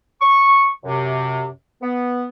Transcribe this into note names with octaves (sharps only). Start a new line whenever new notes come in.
C#6
F#2 C3
B3